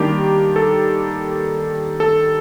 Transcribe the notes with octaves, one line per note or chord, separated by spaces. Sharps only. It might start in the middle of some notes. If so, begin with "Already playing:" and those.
Already playing: D#3 G3 A#3 D4 G4
A4
A4